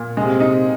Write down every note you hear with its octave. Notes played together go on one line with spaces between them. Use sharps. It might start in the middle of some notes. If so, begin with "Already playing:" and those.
Already playing: A#2
C3 G#3
D#4